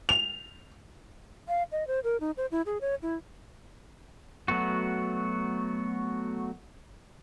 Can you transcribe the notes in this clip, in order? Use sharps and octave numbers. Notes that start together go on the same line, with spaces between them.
F7
F5
D#5
C5
A#4
D#4
C5
E4
G#4
C#5
E4
F#3 A3 B3 F#4